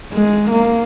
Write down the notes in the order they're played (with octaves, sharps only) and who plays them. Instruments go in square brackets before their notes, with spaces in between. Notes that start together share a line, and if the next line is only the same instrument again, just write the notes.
[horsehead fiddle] G#3
A#3